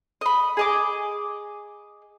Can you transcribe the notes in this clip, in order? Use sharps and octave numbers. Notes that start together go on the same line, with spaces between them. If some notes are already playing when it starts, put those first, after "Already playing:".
D#5 B5
G#4 D#5 D6